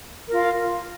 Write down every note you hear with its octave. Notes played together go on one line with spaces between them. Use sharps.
F4 A#4